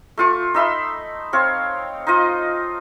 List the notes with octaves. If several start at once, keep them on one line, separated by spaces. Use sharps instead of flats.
A3 F4 C#6
D#4 E5 B5 C6
C4 C#5 F5
D#4 F4 D#5